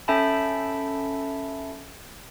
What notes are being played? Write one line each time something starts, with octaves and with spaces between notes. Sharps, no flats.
C#4 A4 E5 G5 A5 B5